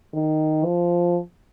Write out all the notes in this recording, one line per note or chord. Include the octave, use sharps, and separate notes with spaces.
D#3
F3